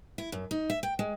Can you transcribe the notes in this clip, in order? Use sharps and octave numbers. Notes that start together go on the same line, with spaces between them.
E4
F#2
D#4
E5
G5
G#3